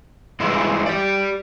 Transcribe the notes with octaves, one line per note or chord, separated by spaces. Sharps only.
G2 E3 G#3 E4
G4 D5